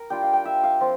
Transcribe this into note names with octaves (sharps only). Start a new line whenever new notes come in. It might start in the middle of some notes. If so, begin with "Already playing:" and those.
Already playing: A#4
G3 D4 F4 G5
F5
G5
E5
F5
F3 C4 F4